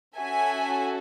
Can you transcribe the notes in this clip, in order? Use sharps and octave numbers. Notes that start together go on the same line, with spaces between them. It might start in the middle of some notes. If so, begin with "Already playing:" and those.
C#4 F#4 A4 E5 G#5